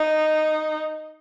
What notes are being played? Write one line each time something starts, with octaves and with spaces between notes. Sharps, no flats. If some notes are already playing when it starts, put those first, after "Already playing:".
Already playing: D#4